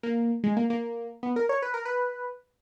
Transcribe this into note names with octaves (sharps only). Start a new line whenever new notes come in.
A#3
G#3
A#3
A#3
B3
A#4
C#5
B4
A#4
B4